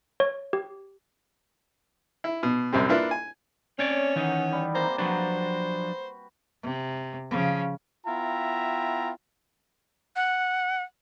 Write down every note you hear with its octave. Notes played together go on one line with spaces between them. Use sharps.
C#5
G4
E4
B2
C2 F#2 G3 C4
A#3 D4 E4 F4 B4
G#5
C4 C#4 C#5 D5
D#3 E3 D#4 F#5
G3
C3 A#3 C5 A#5
F3 F#3 D4 F#4 B4 C5 A#5
C3
C#3 F3
B3 E4 F4 E5 G5 A#5
F#5